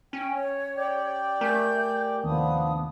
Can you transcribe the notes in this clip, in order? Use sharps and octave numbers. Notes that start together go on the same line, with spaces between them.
C#4 G5
C#5
G4 D5 G5
A3 A#4 G#5 G6
D#2 C3 D#3 F3 B3 D4 D#6